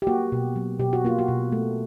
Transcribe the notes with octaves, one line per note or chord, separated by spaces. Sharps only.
G4
A#3 F#4
B2
F#3
B2 G4
F#4
A#3 F4
F#4
B2
A3